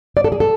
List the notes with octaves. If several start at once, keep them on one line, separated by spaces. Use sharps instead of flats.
D5
A4
G#4
A4